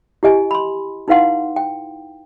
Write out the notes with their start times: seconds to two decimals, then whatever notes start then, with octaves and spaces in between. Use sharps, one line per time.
0.23 E4 G4 D#5 G#5
0.51 B5 C6
1.08 D#4 E4 B4 F5 F#5 C6
1.56 G5